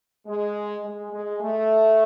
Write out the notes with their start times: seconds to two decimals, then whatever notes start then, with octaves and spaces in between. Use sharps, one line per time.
0.27 G#3
0.84 G#3
1.12 G#3
1.41 A3